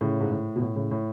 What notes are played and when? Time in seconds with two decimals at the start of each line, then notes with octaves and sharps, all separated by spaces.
0.01 A2 C#3
0.21 G#2
0.31 A2
0.56 B2
0.61 A2
0.76 A2 C#3
0.91 A2